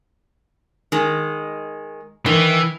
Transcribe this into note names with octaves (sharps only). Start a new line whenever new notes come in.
D#3 G#3
D#3 E3